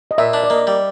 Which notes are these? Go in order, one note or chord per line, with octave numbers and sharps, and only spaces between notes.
D#5
A#2 E5
D4
D5
A#3 D#5
G3